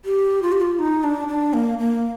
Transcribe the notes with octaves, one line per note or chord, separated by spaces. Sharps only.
G4
F4
G4
F4
D#4
D4
D4
A#3
A#3